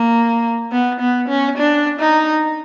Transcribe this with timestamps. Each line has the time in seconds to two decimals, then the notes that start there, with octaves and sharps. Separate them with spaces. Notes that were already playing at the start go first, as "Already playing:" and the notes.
Already playing: A#3
0.72 B3
1.00 B3
1.28 C#4
1.58 D4
2.00 D#4